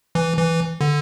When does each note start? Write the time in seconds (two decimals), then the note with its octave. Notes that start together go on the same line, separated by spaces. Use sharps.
0.15 E3
0.37 E3
0.81 D3